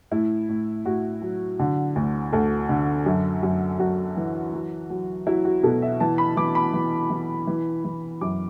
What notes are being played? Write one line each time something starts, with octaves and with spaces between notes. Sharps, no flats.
A2 E4
A2
A2 F#4
F#3
D3
D2
D2 A4
D3
F#2
F#2
F#2 F#4
E3
F#3
F#3
F#3 E4
F#4
B2 A4
E5
E3 A5
B5
E3 D6
B5
E3
E3
E3
E3
F#2 D6